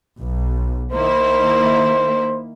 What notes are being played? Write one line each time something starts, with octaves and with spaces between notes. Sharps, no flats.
B1
D#3 A#3 E4 C5